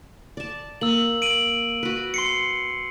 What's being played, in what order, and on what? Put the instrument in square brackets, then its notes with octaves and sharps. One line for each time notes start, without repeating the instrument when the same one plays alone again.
[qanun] D5 A5
[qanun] A#3 [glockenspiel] E6 F#7
[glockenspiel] D7 D#7 F#7
[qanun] F#4 B4
[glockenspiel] C6 C7 C#7